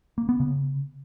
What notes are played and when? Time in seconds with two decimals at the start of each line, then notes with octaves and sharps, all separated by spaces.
0.18 A#3
0.29 B3
0.40 C#3